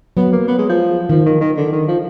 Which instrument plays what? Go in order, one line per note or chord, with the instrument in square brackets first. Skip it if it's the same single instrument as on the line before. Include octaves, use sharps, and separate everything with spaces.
[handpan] F#3 [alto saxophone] B3
[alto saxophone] A#3
B3
G#3
F3
[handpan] D#3 [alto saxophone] F3
[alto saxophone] D#3
D#3
D3
D#3
F3